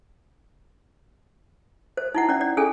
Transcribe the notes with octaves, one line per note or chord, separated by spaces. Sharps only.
C5
D#4 E4 F#5
C#4 D5
D5
C#4 G#4 A4 G#5